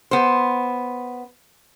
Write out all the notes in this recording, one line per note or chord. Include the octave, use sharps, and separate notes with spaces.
B3 C5